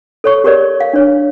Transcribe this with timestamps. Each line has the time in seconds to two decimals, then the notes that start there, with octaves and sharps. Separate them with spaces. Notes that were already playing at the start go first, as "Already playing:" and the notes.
0.24 A4 C#5 C#6
0.44 G4 G#4 A#4 C#5 D5
0.80 F5
0.93 D4 C#5